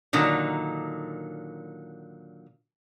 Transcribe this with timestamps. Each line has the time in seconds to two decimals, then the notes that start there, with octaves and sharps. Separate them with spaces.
0.13 A#2 D3 D#3 F#3